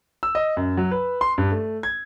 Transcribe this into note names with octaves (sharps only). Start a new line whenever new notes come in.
E6
D#5
F#2
F#3
B4
C6
G2
A3
G#6